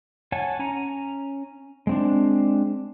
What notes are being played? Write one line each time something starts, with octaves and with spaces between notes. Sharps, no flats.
C#5 F#5 G#5 A5
C#4 G#5 A#5
G#3 C4 D4